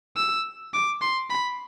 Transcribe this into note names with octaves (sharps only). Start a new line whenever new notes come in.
E6
D6
C6
B5